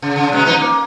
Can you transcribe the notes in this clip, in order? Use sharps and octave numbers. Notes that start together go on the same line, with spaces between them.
C#3
C#3
B2 G#3 C#4
F3 D#4 B4
A#3